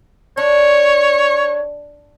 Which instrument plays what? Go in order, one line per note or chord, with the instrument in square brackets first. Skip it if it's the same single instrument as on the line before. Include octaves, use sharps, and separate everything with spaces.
[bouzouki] D4 [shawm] C#5